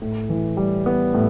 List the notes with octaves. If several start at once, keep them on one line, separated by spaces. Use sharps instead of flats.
A2
E3
G3
B3
A2